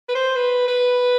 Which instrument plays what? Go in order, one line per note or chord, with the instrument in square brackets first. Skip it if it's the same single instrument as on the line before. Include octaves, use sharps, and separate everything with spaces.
[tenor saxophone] B4
C5
B4
B4